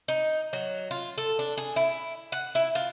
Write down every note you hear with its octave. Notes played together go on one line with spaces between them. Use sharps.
D#4
F#3
F4
A4
D4
G#4
E4
F#5
E4
F4